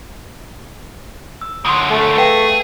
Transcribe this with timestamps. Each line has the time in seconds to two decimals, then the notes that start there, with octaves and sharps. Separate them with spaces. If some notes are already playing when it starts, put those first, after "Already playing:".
1.41 E6
1.65 F#2 D3 C6 D#6
1.90 A3
2.18 G#4 B4 F5 G5